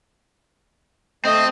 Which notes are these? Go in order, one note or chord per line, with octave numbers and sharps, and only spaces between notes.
A3 C4 D#5